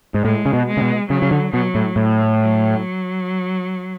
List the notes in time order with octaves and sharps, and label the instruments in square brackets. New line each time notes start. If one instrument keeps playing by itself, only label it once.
[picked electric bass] G#2
[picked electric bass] A2 [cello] G#3
[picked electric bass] C#3
B2
[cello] G#3
[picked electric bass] C#3
B2
[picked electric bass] C#3 [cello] F#3
[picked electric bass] C#3
D3
[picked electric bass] B2 [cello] F#3
[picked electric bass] A2
A2
[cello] F#3